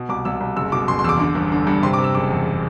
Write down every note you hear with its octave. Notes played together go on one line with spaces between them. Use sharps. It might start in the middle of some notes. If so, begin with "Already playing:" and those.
Already playing: B2
C2 D6
C2 E6
C2
F#1 E6
B2 D6
F#1 C6
C6
E2 E6
D6
D3 D6
G1
D3
G2
C3 C6
D6
C3
E6
F#1 D6
E2